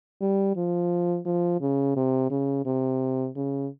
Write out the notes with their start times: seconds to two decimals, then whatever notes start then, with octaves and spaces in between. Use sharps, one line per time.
0.21 G3
0.56 F3
1.26 F3
1.61 C#3
1.96 C3
2.30 C#3
2.65 C3
3.35 C#3